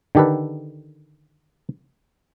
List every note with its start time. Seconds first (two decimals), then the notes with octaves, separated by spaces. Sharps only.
0.15 D3 D#3 G4 A4 B4